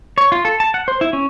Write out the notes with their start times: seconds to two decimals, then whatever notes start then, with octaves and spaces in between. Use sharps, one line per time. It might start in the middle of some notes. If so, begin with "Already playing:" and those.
0.18 C#5
0.32 F4
0.45 A4
0.60 A5
0.74 F#5
0.88 C5
1.01 E4
1.13 C#4